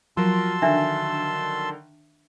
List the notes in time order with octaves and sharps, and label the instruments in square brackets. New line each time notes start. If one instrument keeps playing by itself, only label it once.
[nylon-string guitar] F3 F#3 [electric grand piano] F4 A#4 [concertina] A5 C6 E6
[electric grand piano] D3 D#3 [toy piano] D4 E5